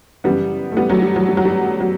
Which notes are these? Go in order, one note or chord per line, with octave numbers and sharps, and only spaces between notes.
F#2 C#3 E3 G3 B3
A3
G3 B3
F#3 A3
G3
F#3
G3
F#3
G3
F#3